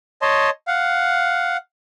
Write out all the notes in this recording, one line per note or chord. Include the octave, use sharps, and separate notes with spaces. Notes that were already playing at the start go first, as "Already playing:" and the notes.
C#5 D#5 A5 C6
F5 F#5